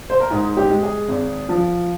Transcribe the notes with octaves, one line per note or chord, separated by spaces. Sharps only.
C5
A#4
G#2 G#4
G4
G#3
G#4
G#1
F3